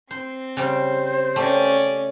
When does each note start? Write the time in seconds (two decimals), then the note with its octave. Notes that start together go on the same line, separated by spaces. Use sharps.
0.11 C4 C5
0.57 C#3 G3 C5
1.36 A3 C#4 G4 D5